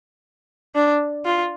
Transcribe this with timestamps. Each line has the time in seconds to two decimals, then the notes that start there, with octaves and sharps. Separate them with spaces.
0.75 D4
1.25 F4